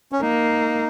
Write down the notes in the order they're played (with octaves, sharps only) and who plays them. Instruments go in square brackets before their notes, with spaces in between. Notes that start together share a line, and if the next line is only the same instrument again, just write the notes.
[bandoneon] C#4
[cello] A#3 [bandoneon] D#4